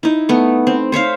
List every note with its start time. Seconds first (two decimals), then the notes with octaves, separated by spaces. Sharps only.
0.03 D#4 E4
0.29 A3 B3
0.67 C4
0.92 C5 C#5 E5 F5